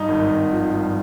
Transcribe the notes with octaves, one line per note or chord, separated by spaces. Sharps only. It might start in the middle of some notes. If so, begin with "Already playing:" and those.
Already playing: G2 D#4
G#1
G#1
F3
G2